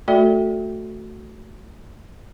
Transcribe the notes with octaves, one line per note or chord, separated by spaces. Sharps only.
A3 F#4 A4 D5 E5